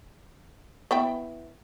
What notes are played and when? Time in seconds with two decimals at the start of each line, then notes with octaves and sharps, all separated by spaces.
0.91 B3 E4 G5